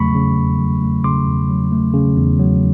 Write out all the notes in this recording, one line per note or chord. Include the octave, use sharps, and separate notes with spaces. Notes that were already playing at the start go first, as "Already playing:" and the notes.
Already playing: E2 C#3 F#3 A3 B5 C#6
C#3
E2
F#3
A3
C#3 C6 D6
E2
F#3
A3
C#3
E2
F#3